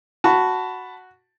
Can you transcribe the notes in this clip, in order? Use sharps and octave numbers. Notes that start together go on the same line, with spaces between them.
F#4 A5 B5